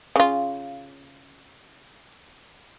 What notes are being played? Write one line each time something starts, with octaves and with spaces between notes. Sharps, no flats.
C#3 F4